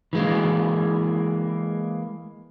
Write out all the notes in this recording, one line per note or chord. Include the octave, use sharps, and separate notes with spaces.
E3 G#3 A#3